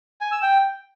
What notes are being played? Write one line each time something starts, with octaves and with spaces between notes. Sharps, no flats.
G#5
E6
G5